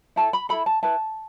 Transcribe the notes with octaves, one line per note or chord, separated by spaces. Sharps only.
E4 A4 A5
B5
E4 A4 B5
A5
E4 B4 A5